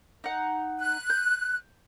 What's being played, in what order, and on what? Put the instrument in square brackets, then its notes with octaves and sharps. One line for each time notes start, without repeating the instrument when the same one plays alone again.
[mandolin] D#4 F#5
[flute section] F#6
[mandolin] G6